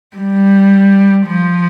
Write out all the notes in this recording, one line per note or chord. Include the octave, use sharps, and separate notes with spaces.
G3
F3